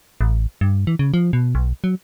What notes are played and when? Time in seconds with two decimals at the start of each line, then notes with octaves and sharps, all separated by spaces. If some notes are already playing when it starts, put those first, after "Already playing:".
0.21 A1
0.61 G2
0.87 E3
0.99 C#3
1.14 F3
1.33 B2
1.55 B1
1.84 F#3